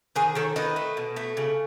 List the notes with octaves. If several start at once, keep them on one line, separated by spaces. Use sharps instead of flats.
D#3 G#4 B4
D#3 A4 C#5
D#3 B4 D#5
A3
B2
A3
C#3